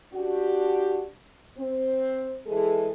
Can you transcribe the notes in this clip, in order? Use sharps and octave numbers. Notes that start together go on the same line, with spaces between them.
D4 F#4 G4
C4
E3 G#3 G#4 A4